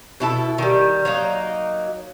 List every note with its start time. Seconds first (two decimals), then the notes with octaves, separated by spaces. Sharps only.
0.20 B2 E4 A4
0.58 D#3 G3
1.05 F#3 A#3 D#4